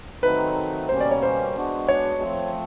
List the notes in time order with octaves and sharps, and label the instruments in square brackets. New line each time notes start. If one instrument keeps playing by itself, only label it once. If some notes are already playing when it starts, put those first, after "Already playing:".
[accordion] D#3 F#3 A3 C4 D#4 [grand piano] B4
[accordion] B2 G3 A#3 C#4 [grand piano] C5
[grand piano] D5
C#5
C5
[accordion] G#3 B3 D4 F#4
[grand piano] C#5
[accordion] F3 A3 C4